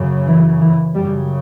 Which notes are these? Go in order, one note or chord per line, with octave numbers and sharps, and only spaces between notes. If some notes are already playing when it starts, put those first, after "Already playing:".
Already playing: F#2 C#3
E3
E3
F#2 C#3 G3